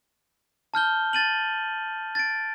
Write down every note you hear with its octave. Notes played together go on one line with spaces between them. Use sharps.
A5 F6 G6 G7
A6 D#7 F#7
A6 D7